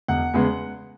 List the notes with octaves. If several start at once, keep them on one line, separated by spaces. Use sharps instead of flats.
E1 F#5
E2 C#3 G#3 B3